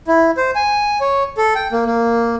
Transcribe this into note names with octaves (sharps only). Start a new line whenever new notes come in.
E4
C5
G#5
C#5
A4
G5
A#3
A#3